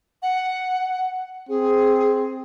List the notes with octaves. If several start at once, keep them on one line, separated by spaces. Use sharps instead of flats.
F#5
C4 G#4